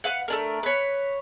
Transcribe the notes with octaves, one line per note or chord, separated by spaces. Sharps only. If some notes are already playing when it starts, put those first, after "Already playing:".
B4 F5 F#5
A3 D4 A#4
B4 C#5